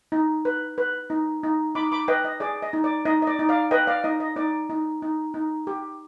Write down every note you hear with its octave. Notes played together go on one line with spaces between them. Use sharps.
D#4
B4
B4
D#4
D#4
D#4 B5 D6
B5 D6
B4 D#5 G5
D#5
G#4 D5
D#5
D#4
D5
D#4 D#5
D#5
D5
D#4
D5 F5
B4 D#5 G5
D5 F5
D#4 D#5
D#5
D#4 D5
D#4
D#4
D#4
G4